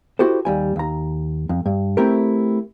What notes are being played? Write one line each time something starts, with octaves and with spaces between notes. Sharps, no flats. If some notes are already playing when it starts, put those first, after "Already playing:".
E4 F#4 G4 A4 C5
D#2 G3 G#5
D#2 A#5
F2
G2
A3 C4 E4 G4 A#4